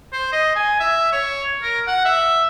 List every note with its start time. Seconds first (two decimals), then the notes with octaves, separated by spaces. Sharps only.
0.13 C5
0.32 D#5
0.56 G#5
0.80 E5
1.12 C#5
1.62 A#4
1.87 F#5
2.05 E5